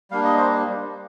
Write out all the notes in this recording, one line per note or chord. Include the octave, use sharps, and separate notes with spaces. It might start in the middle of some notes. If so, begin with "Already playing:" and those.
G3 A#3 D4 F5
D#5
C5